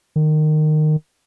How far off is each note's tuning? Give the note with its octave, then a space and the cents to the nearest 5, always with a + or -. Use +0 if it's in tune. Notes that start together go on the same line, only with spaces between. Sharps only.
D#3 -20